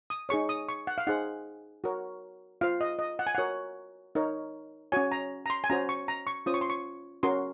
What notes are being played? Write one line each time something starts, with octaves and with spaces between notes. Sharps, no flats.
D#6
D#4 G#4 C#5 C#6
D#6
C#6
F#5
F5
D#4 G#4 C5 F#5
F#4 A#4 C#5
F4 C5 F5
D#5
D#5
F#5
G#5
F#4 A#4 C#5 F#5
D#4 A#4 C#5
C#4 F#4 C#5 G#5
A#5
A#5
C6
G#5
C#4 F#4 C5 A#5
C#6
A#5
C#6
C#4 F4 C5 D#6
C#6
C6
C#6
C#4 F#4 A#4 C#5 C6